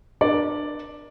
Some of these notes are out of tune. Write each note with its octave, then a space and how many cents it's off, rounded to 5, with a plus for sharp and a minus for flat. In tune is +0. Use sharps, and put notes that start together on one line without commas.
D4 +25 A#4 +45 D5 +0